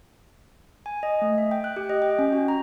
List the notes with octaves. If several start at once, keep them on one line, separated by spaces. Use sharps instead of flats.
G#5
D#5
A3
E5
G5
F#6
G4
D#5
G5
C#4
F#4
A#5